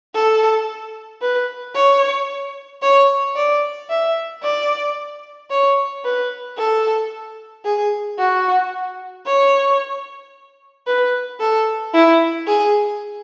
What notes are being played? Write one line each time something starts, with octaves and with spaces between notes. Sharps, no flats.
A4
B4
C#5
C#5
D5
E5
D5
C#5
B4
A4
G#4
F#4
C#5
B4
A4
E4
G#4